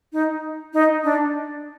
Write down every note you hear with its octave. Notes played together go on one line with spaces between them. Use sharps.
D#4
D#4
D4